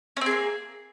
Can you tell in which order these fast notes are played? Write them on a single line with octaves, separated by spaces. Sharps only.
C#4 C4 G#4 A#3